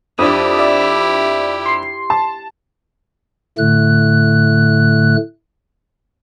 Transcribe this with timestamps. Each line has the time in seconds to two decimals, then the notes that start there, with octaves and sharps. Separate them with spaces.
0.19 F2 D4 E4 G4 D#6
0.59 D5 E5
1.66 C6 C7
2.10 A5
3.58 A2 D3 A3 F#6